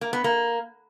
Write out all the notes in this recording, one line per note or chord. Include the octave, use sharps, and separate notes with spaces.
A#3
B3
A#3